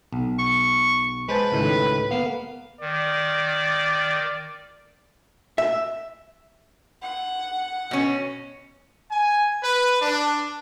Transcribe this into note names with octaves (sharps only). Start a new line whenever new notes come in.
B1
C#6
G#3 B4 C5 A5
C#2 A2 D#3
A#3 B3 F5
D#3 D5
E5
F#5
B2 C#4
G#5
B4
D4